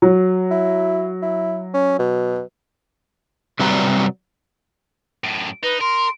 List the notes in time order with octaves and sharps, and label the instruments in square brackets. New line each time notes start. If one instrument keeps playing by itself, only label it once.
[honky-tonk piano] F#3
[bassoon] E4
E4
C#4
B2
[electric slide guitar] C3 F#3 G3 B4 D5 A#5
[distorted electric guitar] F#2 A2
[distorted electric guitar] D#4 [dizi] B4
[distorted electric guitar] A#4 [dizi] C6